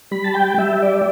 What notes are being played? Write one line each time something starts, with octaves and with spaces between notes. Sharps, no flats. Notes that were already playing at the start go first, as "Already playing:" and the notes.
G3 B5
A5
G5
G3 E5
D5